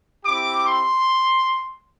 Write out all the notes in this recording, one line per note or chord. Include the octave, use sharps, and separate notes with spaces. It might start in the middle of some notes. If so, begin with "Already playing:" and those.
C4 E4 G4 D6
C6